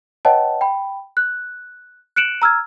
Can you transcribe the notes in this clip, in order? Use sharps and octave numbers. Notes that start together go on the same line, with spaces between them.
B4 C#5 D#5 F#5 G5 A5
G5 B5
F#6
F#6 C#7 D7 E7 F#7
A#5 E6 F6 G#6